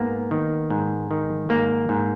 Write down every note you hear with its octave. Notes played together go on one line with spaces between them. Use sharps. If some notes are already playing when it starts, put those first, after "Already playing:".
Already playing: G#2 A#3 B3
D#3
G#2
D#3
G#2 A#3
G#2